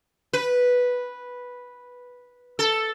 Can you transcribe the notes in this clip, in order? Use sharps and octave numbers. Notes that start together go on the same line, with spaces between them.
B4
A4